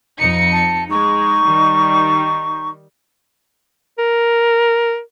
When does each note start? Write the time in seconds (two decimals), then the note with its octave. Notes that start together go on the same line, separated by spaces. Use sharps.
0.18 F2 D#4 C#7
0.51 A5
0.89 G#3 D#4 C#6
1.44 D#3 G3
3.98 A#4